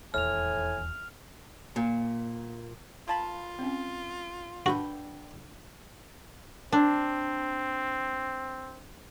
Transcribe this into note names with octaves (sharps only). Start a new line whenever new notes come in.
D#1 E2 A2 G#5 F6 F7
A#2
A#3 F4 A5 B5
C4 C#4
D3 D4 F#4 B4 G5 B5
C4 D4